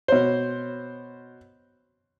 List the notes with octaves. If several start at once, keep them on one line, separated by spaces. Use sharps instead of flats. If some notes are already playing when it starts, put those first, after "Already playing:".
B2 C5 C#5